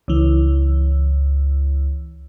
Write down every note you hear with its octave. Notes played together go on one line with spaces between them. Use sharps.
C#2 E3